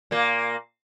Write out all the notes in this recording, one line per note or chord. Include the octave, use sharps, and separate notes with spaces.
A#2 A#3